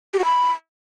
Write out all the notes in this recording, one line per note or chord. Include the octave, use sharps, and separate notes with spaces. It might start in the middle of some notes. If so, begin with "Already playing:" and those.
G4
F#4
B5